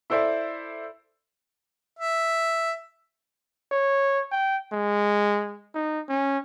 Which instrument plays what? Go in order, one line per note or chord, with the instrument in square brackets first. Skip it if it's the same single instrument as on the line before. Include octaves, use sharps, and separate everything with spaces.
[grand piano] E4 A4 C5 D5 E5
[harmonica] E5
[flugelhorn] C#5
G5
G#3
D#4
C#4